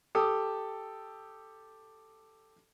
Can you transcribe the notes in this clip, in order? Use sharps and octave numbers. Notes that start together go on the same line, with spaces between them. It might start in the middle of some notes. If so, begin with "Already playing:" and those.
G4 A4 D#6